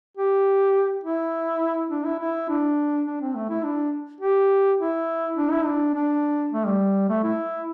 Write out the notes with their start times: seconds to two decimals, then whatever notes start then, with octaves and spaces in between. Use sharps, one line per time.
0.17 G4
1.04 E4
1.91 D4
2.05 E4
2.19 E4
2.49 D4
3.06 D4
3.21 C4
3.35 A3
3.50 E4
3.63 D4
4.21 G4
4.79 E4
5.36 D4
5.51 E4
5.65 D4
5.94 D4
6.52 A3
6.66 G3
7.09 A3
7.24 E4